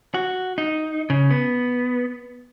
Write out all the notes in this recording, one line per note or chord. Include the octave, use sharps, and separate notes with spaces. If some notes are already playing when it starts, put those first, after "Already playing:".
F#4
D#4
C#3
B3